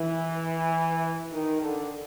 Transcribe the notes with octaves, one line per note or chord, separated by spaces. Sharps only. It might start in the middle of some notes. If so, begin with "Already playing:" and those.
Already playing: E3
D#3
D3